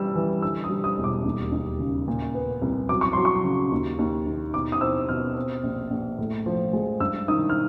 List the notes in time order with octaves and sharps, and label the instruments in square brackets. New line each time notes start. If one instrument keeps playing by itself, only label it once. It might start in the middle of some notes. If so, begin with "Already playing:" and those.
Already playing: [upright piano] E3 G3 E6
E3
D3 E6
D#6
G3
D#6
E1
D6
D#2
D#2
C#3
A#2
B3
C2
F#3 D6
C#6
F#3 C6
C#6
C#3
D#2
D#2
D#3
B2 D6
D#6
C4 E6
B2 F6
C4
A#1
A#1
A2
F3
G#3
G2 E6
D#3 D#6
F6